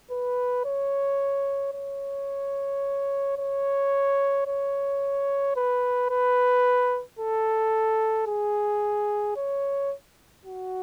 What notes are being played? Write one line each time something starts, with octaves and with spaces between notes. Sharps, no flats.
B4
C#5
C#5
C#5
C#5
B4
B4
A4
G#4
C#5
F#4